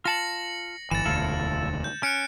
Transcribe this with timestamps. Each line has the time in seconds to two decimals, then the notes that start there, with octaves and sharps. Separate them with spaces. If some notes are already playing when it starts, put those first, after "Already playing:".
0.05 F4 A5 A#6 C#7 F#7
0.91 G1 E3 A6 E7
1.05 E1 D2 E4 F4 A4
1.84 G6
2.03 C#4 F#6 C#7 D7